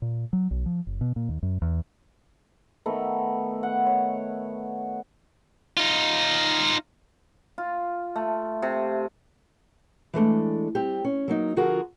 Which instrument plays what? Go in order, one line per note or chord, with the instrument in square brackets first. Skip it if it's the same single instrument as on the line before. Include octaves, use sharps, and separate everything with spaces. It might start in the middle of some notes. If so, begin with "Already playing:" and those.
[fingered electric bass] A#2
F#3
B1
F3
F#1
B2
A#2
D#2
F#2
E2
[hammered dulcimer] D#3 A3 B3
F#5
C#5
[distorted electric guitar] D#4 F4
[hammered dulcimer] F4
A3
C3
[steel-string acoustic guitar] E3 G#3 A3 D4
G3 C4 G4
C#4
F#3 A#3 D#4
D3 F3 F4 F#4 G#4 A#4